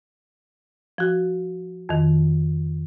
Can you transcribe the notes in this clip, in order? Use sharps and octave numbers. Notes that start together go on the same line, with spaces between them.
F3 F#4
F2 D#3